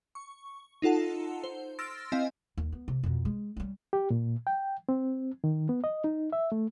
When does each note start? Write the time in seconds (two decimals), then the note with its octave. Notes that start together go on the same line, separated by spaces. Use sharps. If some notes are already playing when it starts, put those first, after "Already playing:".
0.15 C#6
0.82 D#4 F4 A4 F#5 A5
1.44 C5
1.79 C6 E6 F6 A6 A#6 D7
2.12 C4 E4 D#5 F5 G#5
2.57 D#2
2.72 B3
2.88 C3
3.03 F2 B2
3.25 G#3
3.57 G3 C#4
3.93 G4
4.10 A#2
4.47 G5
4.89 C4
5.44 D#3
5.69 B3
5.84 D#5
6.04 D#4
6.33 E5
6.52 A3